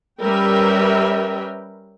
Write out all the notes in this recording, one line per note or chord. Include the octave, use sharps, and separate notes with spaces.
G3 C#4 A#4 B4 E5 G5